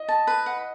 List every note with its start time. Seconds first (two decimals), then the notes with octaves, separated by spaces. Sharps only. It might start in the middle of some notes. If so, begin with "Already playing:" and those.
Already playing: D#5
0.08 A5
0.27 B4
0.46 F#5